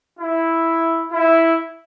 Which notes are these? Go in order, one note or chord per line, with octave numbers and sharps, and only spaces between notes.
E4
E4